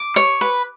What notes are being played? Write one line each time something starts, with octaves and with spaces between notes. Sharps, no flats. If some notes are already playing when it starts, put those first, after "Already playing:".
Already playing: D6
C#5
B4